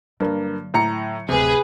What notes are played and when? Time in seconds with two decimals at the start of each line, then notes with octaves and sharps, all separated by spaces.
0.20 G2 D3 F#3 A#3
0.74 A2 A#5 C#7
1.29 D1 G#1 C3 G#4 B4